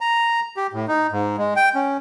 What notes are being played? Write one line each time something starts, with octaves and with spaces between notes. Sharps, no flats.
A#5
G4
A2
D#4
G#2
G#3
G5
C#4